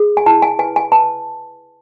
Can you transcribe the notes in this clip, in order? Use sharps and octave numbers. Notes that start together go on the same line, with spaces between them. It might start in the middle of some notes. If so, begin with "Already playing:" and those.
Already playing: G#4
G#5
E4 A5
G#5
B4 G#5
G#5
B4 A5